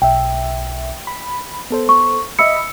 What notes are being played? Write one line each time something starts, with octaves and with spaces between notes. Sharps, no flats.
B1 E5 G5
B5
B3 A4 C5
C#6
D#5 E5 B5 E6 C#7